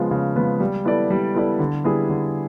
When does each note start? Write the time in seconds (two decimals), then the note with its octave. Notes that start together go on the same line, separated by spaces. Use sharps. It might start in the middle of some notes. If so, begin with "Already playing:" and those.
Already playing: C#3 F3 G#3 B3
0.11 C#3
0.36 F3 G#3 B3
0.60 G3
0.85 B3 E4 A4 D5
1.10 G3
1.34 B3 E4 A4 D5
1.59 D3
1.84 G3 B3 E4 G#4
2.09 D3